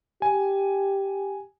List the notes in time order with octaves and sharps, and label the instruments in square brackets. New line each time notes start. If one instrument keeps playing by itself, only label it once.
[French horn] G4 [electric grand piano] G#5